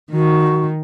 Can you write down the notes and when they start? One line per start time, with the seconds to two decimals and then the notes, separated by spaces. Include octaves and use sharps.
0.12 D#3 F#4